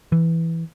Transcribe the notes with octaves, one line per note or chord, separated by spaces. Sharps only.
E3